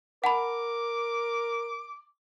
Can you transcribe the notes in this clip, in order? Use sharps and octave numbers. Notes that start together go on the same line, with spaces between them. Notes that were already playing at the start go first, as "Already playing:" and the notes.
A#4 F#5 A5 B5 D6